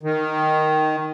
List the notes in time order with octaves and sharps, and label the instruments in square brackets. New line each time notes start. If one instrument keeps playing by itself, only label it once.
[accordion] D#3